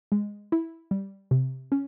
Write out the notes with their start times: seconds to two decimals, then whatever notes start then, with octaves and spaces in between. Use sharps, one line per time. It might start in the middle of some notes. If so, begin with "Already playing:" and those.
0.12 G#3
0.52 E4
0.91 G3
1.31 C3
1.72 C#4